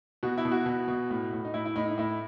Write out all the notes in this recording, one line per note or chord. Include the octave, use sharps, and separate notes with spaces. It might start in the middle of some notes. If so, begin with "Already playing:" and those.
B2 F#4
E4
B2
F#4
B2
B2
A2
A2
D#4
A2 E4
E4
A2 D#4
D#4
A2 E4